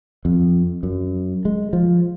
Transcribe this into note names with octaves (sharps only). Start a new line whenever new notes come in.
F2
F#2
G#3
F3